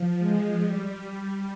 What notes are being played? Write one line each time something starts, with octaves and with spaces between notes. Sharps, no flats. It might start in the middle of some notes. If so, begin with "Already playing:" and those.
Already playing: F3
G#3
G3
G3